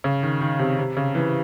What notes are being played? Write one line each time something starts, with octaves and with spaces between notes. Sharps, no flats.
C#3
D#3
D#3
C3
C3
C#3
E3